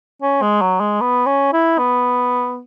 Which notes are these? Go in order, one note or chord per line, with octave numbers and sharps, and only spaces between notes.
C#4
G#3
F#3
G#3
B3
C#4
E4
B3